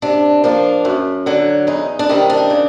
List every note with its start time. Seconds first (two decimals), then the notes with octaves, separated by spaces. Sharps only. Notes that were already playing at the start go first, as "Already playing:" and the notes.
0.02 C3 D4
0.44 F3 A#3 D4
0.85 F#2
1.26 D3 F#3
1.67 E2 D#4
1.99 D4
2.09 C3 D#3 G3 D#4
2.30 D4
2.50 C#3